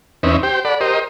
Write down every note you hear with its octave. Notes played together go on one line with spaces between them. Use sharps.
E2 C4 C#4 D#4 B4 E5
G4 C5 G5
A4 D5 F#5 B5
G4 A#4 C5 D#5